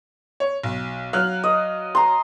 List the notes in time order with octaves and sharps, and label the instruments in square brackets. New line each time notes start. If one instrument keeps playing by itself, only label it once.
[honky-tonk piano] C#5
B1
[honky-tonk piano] F#3 F6 F#6 [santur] F5
[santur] D#5
A#5 C6